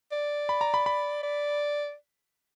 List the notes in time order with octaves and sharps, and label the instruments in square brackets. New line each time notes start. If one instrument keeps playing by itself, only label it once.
[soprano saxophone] D5
[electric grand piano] B5
A#5
B5
B5
[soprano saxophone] D5